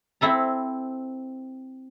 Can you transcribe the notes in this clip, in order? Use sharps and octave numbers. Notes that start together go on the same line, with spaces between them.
C4 E4 A4 A#5